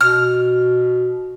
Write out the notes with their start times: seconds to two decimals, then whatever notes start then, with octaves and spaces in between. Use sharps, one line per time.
0.01 B2 F6